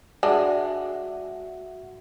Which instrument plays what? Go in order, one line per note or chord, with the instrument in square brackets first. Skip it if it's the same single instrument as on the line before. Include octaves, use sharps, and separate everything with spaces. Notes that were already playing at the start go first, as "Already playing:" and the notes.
[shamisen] G#3 D4 [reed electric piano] F#4 E5 F#5